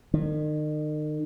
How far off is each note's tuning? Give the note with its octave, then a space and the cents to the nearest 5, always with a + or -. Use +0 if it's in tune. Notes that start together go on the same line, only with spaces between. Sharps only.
D#3 -40